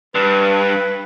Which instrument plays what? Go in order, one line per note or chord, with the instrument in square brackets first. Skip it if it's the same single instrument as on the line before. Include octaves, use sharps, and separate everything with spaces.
[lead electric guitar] G2 [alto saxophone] B4